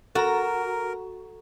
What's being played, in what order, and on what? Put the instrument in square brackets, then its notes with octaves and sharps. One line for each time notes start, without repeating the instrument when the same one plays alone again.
[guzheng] F#4 [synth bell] A4 A#5 [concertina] A#4